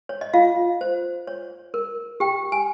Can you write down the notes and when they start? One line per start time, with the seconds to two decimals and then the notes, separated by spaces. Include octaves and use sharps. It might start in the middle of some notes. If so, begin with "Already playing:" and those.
0.09 C#5
0.21 D#5
0.34 F4 F5
0.81 C5
1.27 C#5
1.74 A#4
2.20 G4 G5
2.52 G#5